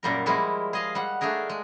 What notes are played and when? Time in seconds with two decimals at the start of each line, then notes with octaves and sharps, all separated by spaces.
0.03 F#2 A#2 G3 A#4
0.26 F3 G3 G#3 A#3 E4
0.73 G#4 D#5 F5
0.95 G3 F#5
1.21 A3 D4 G4 G#4 A#4
1.49 G#3